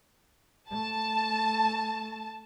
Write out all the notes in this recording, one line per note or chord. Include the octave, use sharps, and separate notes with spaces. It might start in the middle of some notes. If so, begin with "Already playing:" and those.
A3 A5